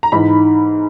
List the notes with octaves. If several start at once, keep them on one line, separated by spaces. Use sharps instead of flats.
A#5
G#2 E3 B5